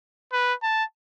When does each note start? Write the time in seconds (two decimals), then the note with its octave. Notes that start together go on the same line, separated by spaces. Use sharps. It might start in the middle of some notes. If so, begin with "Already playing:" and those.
0.33 B4
0.63 A5